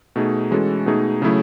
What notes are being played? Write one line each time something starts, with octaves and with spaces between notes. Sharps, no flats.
B2 A3 D#4 G#4
E3 G#3 C#4 F#4 A4
B2 A3 D#4 G#4
C#3 F#3 A3 E4 G#4